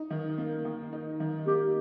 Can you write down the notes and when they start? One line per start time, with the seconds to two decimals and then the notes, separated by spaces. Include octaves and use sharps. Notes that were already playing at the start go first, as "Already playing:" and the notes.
Already playing: D#4
0.10 D#3
0.38 A#3
0.65 D#3
0.93 D#4
1.20 D#3
1.47 A#3 G4